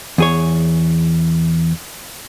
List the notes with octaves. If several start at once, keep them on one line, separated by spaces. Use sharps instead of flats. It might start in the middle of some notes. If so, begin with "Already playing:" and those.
E2 G#4 C#5